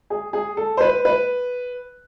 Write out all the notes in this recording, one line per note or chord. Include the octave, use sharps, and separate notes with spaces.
G#4
G#4
A4
C5
B4
B4